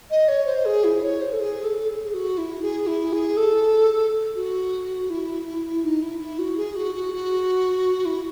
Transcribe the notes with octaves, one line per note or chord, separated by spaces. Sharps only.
D#5
C#5
C5
G#4
E4
C#5
C5
A4
G#4
A4
G#4
F#4
E4
G#4
E4
G#4
A4
F#4
E4
D#4
E4
E4
F#4
G#4
F#4
F#4
F#4
E4